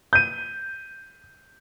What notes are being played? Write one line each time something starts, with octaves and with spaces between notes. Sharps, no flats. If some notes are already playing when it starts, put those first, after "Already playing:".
G6 D#7